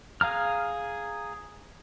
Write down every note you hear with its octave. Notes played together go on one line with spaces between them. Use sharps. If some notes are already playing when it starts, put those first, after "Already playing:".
G#4 F5 A#5 F6